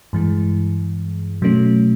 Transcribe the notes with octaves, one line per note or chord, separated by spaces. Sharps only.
G2 E3 G#3
B2 F#3 A3 C#4